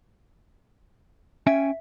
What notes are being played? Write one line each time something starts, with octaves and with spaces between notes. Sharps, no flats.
C#4 E5 G5 G#5